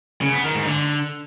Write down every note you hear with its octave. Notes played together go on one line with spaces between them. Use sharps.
C#3
B3
D#3
G#2
D3